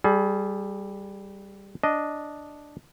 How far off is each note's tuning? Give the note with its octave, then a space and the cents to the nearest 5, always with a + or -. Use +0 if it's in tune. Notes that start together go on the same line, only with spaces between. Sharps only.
G3 +0 G#4 +30
D4 +0 D#5 +0